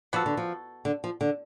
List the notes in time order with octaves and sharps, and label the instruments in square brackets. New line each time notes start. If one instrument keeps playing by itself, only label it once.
[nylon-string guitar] F3 [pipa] B3 F#4 A4
[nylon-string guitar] D3
F3
D3
F3
D3